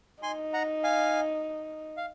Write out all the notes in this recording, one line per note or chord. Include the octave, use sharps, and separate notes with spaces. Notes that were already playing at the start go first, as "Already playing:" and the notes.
D#4 G#5 C6
F#5 A#5
F5 G#5
F5